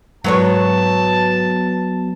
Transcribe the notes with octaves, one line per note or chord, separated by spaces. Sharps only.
G#2 F#3 B3 C#5 A5